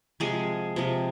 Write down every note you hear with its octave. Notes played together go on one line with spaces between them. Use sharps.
C3 F3 G#3 G#4
C3 F3 G#3